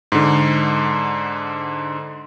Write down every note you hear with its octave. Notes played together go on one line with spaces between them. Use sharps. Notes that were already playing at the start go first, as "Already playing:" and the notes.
G#2 D3